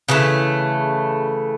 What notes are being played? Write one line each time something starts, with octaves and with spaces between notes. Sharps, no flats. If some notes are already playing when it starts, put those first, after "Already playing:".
C#3 E3 A3